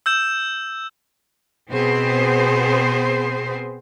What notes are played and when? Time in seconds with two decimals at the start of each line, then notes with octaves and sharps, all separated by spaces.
0.06 E6 G6 E7
1.71 B2 B3 C4 G#4 C5